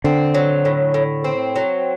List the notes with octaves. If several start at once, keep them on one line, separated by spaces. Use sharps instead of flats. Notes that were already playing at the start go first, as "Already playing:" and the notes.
D3 C4
F#3
A2
A2
C4
F#3